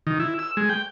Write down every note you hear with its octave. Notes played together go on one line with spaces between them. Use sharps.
D#3
E4
E6
G#3
G5